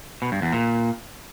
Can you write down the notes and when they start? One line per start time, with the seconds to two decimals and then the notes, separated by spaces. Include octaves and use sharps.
0.22 B2
0.32 G2
0.42 E2
0.52 A#2